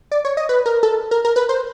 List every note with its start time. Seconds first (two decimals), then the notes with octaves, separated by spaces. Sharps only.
0.11 D5
0.25 C#5
0.37 D#5
0.49 B4
0.66 A#4
0.83 A4
1.11 A#4
1.25 A#4
1.36 B4
1.49 C5